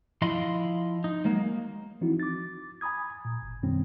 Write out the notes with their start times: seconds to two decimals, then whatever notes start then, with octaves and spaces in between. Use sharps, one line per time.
0.22 F3 E4 D#5 F5 B5 C6
1.04 D#4
1.25 F#3 G#3 A#3
2.01 E3 F3 C4 D#4 E4 F#4
2.20 D6 A6
2.81 G#5 A#5 B5 D#6 G#6
3.25 A#2
3.42 G1
3.63 F#2 B2 D#3 G3 C4 C#4